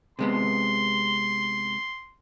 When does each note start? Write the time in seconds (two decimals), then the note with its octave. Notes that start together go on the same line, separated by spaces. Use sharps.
0.19 C3 G#3 B3 C6